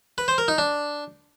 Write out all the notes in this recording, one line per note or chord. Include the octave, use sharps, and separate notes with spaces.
B4
C5
A#4
D#4
D4